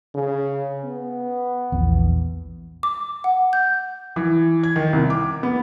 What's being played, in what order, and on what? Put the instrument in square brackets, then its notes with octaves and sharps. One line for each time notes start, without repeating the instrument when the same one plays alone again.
[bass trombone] C#3
B3
[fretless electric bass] A#1 E2
[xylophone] D6
F#5
G6
[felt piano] E3
G#6
D#3
C2
D6
B3